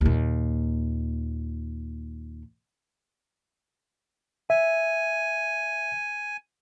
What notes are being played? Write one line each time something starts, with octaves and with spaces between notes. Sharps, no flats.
D#2 A#2
E5 G#5